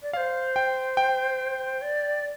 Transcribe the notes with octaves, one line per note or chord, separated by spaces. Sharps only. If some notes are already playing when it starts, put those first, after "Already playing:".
D5
C5 D5 F5
G5
G5
D5